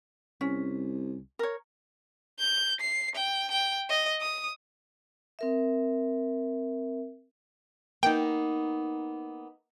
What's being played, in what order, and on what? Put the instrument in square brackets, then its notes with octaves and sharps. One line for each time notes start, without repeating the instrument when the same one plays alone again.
[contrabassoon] C2 [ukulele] C#4
[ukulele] A#4 C#5
[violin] G6
C7
G5
G5
D#5
D#6
[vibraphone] C4 A#4 E5
[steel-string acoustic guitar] A#3 B3 D#4 [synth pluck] G5